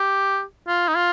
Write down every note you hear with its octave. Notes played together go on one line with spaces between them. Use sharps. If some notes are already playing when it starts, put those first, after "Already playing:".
Already playing: G4
F4
D#4
F4